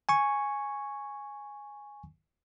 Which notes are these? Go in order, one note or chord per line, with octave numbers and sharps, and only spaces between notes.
G#5 C#6